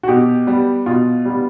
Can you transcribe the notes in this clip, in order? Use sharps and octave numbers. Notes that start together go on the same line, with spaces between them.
F#4
B2 G4
G3 B3
B2 F4
G3 B3